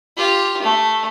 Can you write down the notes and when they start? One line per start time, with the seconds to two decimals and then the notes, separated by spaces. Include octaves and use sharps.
0.17 F4 G4
0.62 A3